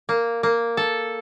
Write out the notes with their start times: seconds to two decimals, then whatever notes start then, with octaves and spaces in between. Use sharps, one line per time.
0.09 A#3
0.43 A#3
0.77 A4